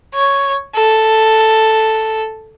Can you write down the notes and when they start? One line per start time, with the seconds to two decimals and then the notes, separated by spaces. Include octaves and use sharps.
0.14 C#5
0.75 A4